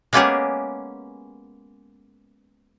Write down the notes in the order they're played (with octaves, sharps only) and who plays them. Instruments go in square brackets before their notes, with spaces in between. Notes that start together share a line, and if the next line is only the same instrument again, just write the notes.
[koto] G#3 A#3 B3 C#4 G4 G#4